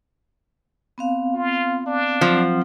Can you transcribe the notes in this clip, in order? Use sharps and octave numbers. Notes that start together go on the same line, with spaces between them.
B3 C4 F5
F4
D4
F3 F#3 C4 F#5